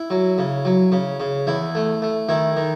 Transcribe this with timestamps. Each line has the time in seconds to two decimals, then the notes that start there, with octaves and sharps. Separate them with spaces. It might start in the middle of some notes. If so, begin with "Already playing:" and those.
Already playing: E4
0.10 F#3
0.38 C#3
0.65 F#3
0.92 C#3
1.20 C#3
1.47 E2 E4
1.75 A3
2.02 A3
2.29 D#3 E4
2.56 D#3